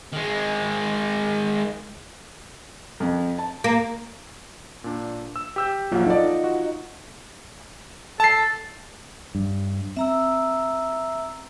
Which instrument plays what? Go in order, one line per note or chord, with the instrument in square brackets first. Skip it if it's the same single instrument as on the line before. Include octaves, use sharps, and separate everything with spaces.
[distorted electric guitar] D#3 G#3
[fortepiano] F2
A5
[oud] A#3
[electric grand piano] A#2 D4
E6
G4 E6 G6
[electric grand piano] A#1 F#3 A#3 [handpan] F4 F#5
[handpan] D#4 D#5 [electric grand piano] A4 D5
[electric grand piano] F#4
[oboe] A4 [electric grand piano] A5 C7
[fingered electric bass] G2
[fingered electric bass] C4 [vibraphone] E5 A#5 E6